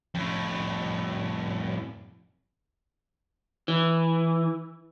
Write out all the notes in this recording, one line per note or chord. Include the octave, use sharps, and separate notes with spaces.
F2 A2
E3